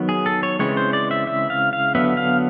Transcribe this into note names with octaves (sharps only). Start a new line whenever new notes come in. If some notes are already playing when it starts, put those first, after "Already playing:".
Already playing: D#3 F#3 B3
G#4
A4
C#5
C#3 E3 G#3 C4 C#5
C5
D5
E5
E5
F5
F5
D3 F#3 B3 E5
F5